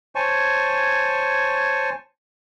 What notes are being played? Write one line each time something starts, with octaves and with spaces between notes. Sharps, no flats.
C5 C#5 G#5 A5 C#6